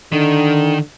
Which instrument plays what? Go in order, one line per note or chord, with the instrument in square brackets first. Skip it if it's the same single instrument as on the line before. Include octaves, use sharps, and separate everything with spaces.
[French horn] D3 [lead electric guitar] D#3